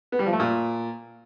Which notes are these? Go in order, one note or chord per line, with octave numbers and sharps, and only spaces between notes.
B3
G3
F3
A3
A#2